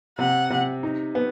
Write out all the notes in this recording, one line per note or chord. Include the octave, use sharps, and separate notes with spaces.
C3 F#5
C3
D#4
B3